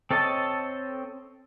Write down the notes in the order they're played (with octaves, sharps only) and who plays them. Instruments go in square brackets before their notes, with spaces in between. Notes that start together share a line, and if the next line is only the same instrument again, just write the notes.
[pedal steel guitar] C4 A4 C#5 D#5 A5